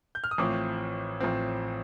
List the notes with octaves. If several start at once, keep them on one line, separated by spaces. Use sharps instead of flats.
G6
F6
D#6
A1 A2 F3 C4 D6
A1 A2 F3 C4